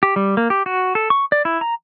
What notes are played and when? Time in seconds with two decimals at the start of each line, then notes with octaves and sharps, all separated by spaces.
0.03 G4
0.16 G3
0.37 A#3
0.50 G4
0.66 F#4
0.95 A4
1.10 C#6
1.32 D5
1.45 E4
1.61 A#5